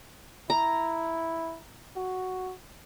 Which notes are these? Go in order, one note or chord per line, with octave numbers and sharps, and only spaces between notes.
E4 A#5
F#4